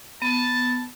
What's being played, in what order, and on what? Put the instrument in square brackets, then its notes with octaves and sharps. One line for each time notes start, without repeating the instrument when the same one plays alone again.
[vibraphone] B3 [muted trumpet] A5